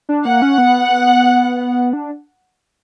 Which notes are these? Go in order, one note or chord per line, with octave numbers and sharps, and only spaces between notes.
D4
A#3 F#5
C#4
B3
D4